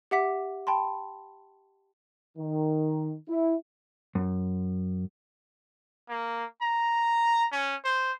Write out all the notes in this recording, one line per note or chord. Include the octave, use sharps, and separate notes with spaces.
G4 E5 F#5 D6 B6
G5 A5 B5 C6
D#3
E4
F#2
A#3
A#5
C#4
C5